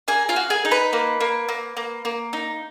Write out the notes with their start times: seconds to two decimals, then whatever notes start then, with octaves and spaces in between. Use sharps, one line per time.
0.08 A#3 G#4 G#5
0.29 F4 F5
0.36 F#4
0.50 G#4 G#5
0.65 D#4
0.71 B4 B5
0.93 A#3
1.20 A#3
1.49 A#3
1.77 A#3
2.05 A#3
2.33 D#4